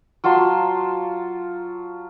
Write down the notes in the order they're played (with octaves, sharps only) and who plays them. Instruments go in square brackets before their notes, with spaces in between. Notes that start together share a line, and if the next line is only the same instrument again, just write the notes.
[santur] F#3 F4 A5 C6